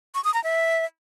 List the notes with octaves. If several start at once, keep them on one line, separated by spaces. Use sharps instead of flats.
C#6
D#6
A#5
E5